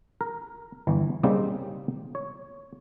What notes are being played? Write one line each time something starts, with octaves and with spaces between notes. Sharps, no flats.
A#4
G1 E3
C#3 G3 A#3 C4 D#4
C#5